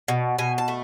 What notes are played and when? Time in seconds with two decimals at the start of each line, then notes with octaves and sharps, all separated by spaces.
0.08 B2
0.39 B2 G#5
0.58 A5
0.68 A3